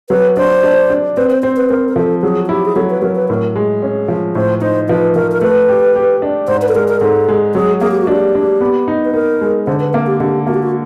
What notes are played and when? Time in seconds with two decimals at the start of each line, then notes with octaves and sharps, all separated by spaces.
0.10 F#3 B4
0.37 D4 C5
0.63 D4
0.90 D4
1.17 C4 B4
1.30 C5
1.43 C4 C5
1.56 B4
1.70 C4 A#4
1.89 A#4
1.96 F3 A4
2.22 F#3 G#4
2.46 F#4
2.49 E4 G4
2.65 G#4
2.76 F#3 A4
2.90 B4
3.02 F#3 A#4
3.15 B4
3.29 A2 A#4
3.56 G#3
3.82 C#4
4.08 F3
4.35 A2 C5
4.62 D#4 C5
4.89 F3 B4
5.15 F3 A#4
5.32 A#4
5.41 A3 B4
5.69 G4
5.96 G4
6.22 D4
6.48 G#2 C5
6.62 B4
6.69 A4
6.75 G#3 A#4
6.88 A#4
7.01 G#2 A4
7.28 G#3
7.54 F#3 G#4
7.81 A#3 G#4
7.91 G4
8.01 F#4
8.07 D4
8.12 G4
8.35 D4
8.61 B3
8.88 D#4
9.05 B4
9.13 D#4 A#4
9.41 G#3
9.67 D3 C5
9.80 B4
9.93 A#3 A#4
10.07 G4
10.20 D3 G4
10.47 A#3 F#4
10.54 G4
10.63 F#4